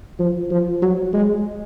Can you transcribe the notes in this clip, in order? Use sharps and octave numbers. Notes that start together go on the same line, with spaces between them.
F3
F3
F#3
G#3